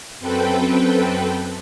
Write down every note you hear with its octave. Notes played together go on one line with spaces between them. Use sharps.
F#2 C4 A4 B4 G5